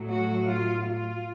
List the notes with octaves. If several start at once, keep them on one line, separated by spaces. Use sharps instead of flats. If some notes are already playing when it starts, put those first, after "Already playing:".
Already playing: A2 F#3 A3
F#4
F4
F4